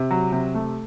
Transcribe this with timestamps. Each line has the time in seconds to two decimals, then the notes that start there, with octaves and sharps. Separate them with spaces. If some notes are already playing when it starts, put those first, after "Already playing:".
Already playing: C3
0.11 F#3
0.32 C3
0.54 A3